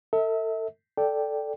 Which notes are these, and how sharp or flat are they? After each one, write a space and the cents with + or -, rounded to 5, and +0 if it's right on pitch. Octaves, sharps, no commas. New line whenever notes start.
A4 +35 E5 -35
A4 +0 D5 +0 G5 +0